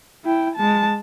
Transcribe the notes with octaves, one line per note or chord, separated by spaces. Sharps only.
E4 G5
G#3 A5